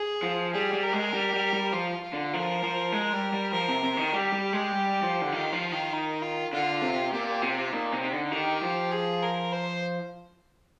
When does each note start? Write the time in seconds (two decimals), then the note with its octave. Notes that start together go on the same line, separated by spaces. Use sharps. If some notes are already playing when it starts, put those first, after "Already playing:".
Already playing: G#4
0.23 F3
0.53 G3 G#4
0.73 G3
0.83 A#4
0.93 G#3
1.14 G3
1.33 G3
1.53 G3
1.73 F3 F4
2.04 F4
2.13 D3
2.33 F3 A#4
2.63 F3
2.92 G#3
3.13 G3
3.33 G3
3.52 F3 A#4
3.68 C3
3.83 C3
3.97 D#3
4.13 G3 G4
4.32 G3
4.53 G#3
4.72 G3
5.03 F3
5.22 D3
5.32 D#3 F4
5.53 F3
5.72 D#3
5.93 D#4
6.22 F4
6.53 D3 F4
6.82 C3
7.12 A#2 G4
7.42 C3 F4
7.72 A#2 D#4
7.92 C3
8.02 D#4
8.12 D3
8.32 D#3 G4
8.63 F3
8.91 G#4
9.22 A#4
9.52 C5